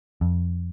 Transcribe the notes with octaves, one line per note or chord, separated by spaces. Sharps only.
F2